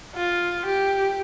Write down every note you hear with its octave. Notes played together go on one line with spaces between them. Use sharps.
F4
G4